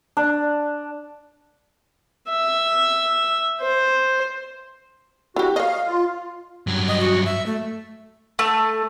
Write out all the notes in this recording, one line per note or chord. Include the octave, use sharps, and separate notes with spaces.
D4
E5
C5
E4 F#4 G4
C#5 D#5 F5
F4
G2 F#3
D#5
F#4
E5
A3
A3